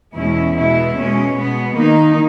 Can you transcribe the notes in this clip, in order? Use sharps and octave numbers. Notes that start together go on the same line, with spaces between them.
E2 B2 G#3 C#4 E4
B2 G#3 B3 E4
B2 G#3 C#4
B2 G#3 B3
D#3 A#3 D#4